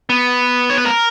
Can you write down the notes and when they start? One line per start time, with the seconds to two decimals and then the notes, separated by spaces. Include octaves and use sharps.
0.10 B3
0.70 C#5
0.78 B4
0.86 A#4